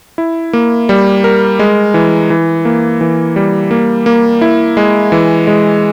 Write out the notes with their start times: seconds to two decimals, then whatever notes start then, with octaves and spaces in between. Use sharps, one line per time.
0.18 E4
0.53 A#3
0.89 G3
1.24 A#4
1.59 G#3
1.94 E3
2.30 E3
2.65 A#3
3.01 E3
3.36 G3
3.71 A#3
4.06 A#3
4.41 E4
4.77 G#3
5.12 E3
5.47 G#3